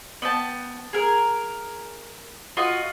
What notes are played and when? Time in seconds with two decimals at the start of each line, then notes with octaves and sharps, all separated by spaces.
0.22 B3 G5 A5
0.93 G#4 A#4
2.57 F4 F#4 D#5